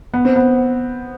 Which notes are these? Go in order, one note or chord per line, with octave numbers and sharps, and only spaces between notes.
B3
C4
B3